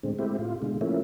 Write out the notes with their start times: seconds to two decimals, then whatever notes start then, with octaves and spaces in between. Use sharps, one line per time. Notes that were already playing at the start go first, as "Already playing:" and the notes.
0.03 A2 D3 G#3 C4
0.19 G#3 A3 C4 E4 G4
0.39 A2 F4
0.62 B2 D3 G#3
0.81 F3 A3 A#3 C#4 E4